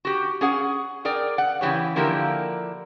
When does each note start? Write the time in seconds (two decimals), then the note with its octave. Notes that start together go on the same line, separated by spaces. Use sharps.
0.05 F#4 G4
0.41 C#4 G#4 F#5
1.05 G#4 A#4 D5 G5
1.38 F#5
1.61 C#3 E3 F#3 G4 C#5
1.96 D3 F3 A#3 E4 G4 A#4